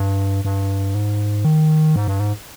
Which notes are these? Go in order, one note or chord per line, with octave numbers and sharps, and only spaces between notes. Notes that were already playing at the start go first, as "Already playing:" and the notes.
Already playing: G2
G2
G#2
D#3
G#2
G2
G#2